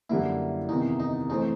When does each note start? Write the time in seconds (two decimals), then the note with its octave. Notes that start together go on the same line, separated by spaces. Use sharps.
0.09 F#2 D3 G3 A#3 E4
0.69 E2 C3 D#3 D#4
1.00 D#4
1.29 E3 A3 C4 D#4